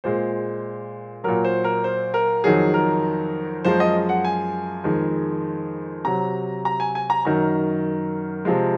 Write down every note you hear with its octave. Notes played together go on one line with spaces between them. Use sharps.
A#2 G#3 C5
A#2 F#3 A#4
C5
A#4
C5
A#4
F2 D#3 F#3 G#4
A#4
F#2 F3 G#3 C5
D#5
F#5
G#5
F2 D#3 G#3
C3 F#3 A#5
A#5
G#5
G#5
A#5
F#2 D#3 F#3 A#5
C3 F3 G#3